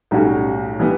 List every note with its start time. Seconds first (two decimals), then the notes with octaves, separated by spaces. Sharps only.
0.11 B1 A2 G3 C#4 F#4
0.80 E3 G3 B3